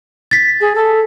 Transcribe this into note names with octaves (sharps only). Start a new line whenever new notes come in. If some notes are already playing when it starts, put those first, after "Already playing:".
A6 B6
G#4
A4